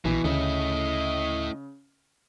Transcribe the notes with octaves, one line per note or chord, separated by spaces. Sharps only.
A#1 B2 E3
D2 C#3 A3 E4 D#5